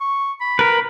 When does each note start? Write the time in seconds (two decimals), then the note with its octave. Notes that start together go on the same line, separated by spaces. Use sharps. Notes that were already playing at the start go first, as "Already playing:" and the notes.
0.01 C#6
0.41 B5
0.59 A#4 B4 B5